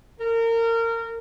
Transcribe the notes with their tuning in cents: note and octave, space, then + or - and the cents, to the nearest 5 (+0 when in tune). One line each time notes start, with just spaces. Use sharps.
A#4 -25